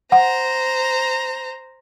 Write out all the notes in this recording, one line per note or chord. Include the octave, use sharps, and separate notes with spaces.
C5 F#5 A#5